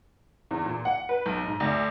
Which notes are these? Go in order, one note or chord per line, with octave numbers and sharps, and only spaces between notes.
E2
A#2
F#5
B4
B1
G#2
D2